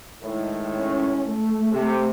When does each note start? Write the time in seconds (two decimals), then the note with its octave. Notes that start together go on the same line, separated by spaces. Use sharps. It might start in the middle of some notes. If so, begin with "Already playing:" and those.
0.22 A2 D#3 G#3
0.77 C#4
1.30 A3
1.71 C3